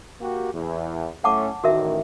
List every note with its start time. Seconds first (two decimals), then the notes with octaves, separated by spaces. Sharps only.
0.21 A#3 F#4 G4
0.53 E2
1.24 A2 A3 C#4 F#5 A5 D6
1.64 A1 D#3 F#4 A#4 E5